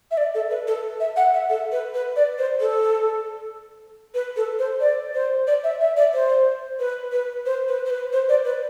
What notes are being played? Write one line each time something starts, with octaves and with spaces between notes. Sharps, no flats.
E5
D5
A4
B4
A4
E5
F#5
E5
A4
B4
B4
D5
C5
A4
B4
A4
C5
D5
C5
D5
E5
E5
D5
C5
B4
B4
C5
B4
C5
B4
C5
D5
B4